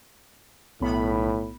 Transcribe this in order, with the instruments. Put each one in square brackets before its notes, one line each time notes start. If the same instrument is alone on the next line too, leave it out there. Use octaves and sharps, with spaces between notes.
[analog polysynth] B1 B3 B5 [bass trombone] A2